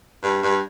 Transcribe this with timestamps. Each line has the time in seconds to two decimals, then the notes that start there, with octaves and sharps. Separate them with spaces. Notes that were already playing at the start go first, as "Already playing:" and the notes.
0.23 G2
0.43 G2